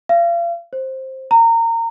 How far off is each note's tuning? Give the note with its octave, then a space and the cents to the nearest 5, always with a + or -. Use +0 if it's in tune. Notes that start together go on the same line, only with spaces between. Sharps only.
F5 -35
C5 +10
A#5 -25